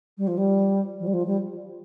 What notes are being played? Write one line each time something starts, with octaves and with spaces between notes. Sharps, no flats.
G3
F3
G3
F3
G3
F3
G3